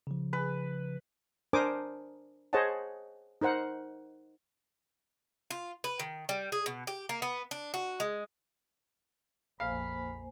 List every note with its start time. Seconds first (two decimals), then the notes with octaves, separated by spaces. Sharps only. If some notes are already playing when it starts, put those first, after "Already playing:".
0.07 C#3 F3
0.33 B4
1.53 D4 A#4 C5 G#5 D6 D#6
2.53 G#4 C5 C#5 D#5 F#5 A5
3.41 D#4 A#4 C5 F#5
5.50 F4
5.84 B4
5.99 D#3
6.29 G3
6.52 G#4
6.66 B2
6.87 G4
7.09 A#3
7.22 B3
7.51 D4
7.74 F#4
8.00 G#3
9.60 A#1 F2 A#3 C5 F5 G#5 B5